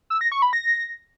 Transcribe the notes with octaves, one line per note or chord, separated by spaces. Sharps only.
E6
A#6
C#6
B5
A#6